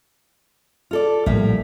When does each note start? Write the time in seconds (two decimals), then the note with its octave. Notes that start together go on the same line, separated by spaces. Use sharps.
0.91 F4 A4 D5
1.26 A#1 A2 G3 A#3 E5